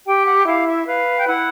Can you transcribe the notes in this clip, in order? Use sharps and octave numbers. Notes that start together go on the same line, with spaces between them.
G4 G5
F#5
E4 F5
E5
B4 F5
G5
E4 F#5